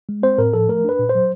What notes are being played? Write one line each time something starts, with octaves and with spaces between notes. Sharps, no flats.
G#3
C4 C5
A2 A#4
F3 A4
A3 A#4
D4 B4
A#2
C5
F#3